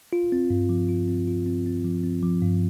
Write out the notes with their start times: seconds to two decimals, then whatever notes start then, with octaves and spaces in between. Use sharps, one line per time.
0.13 F4
0.32 C4
0.50 G2
0.69 F3
0.89 F4
1.08 C4
1.27 F4
1.46 C4
1.66 C4
1.85 F3
2.04 C4
2.23 F3
2.42 G2